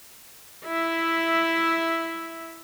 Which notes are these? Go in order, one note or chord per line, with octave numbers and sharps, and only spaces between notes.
E4 E5